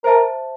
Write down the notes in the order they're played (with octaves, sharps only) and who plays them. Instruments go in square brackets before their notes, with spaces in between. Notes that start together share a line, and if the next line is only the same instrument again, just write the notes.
[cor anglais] A#4 [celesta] C5 E5 A5